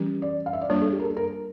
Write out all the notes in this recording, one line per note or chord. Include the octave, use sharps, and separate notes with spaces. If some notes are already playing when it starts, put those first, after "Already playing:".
Already playing: E3 G3 C#4 G4
D5
F5
E5
D5
G3 A#3 D4 F4 C#5
A4
G4
A#4
A4
A#4